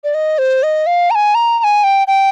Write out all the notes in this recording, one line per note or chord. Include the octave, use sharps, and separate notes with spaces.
D5
D#5
C5
D#5
F5
A#5
G#5
A#5
A#5
G#5
G5
G5